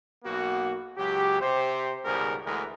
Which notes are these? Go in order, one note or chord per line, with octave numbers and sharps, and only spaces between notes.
B1 A#3 B3 F#4
C#2 F#3 G4
C3 G4 C5
C#2 G#2 B2 G3 A#4
D2 E3 G#3 A3 A#4